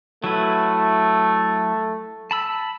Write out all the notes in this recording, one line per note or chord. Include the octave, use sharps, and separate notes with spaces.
F#3 A3 E4 B4
A5 B5 E6